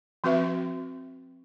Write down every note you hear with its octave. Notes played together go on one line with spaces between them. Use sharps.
F3 C4 F#4 B4 E5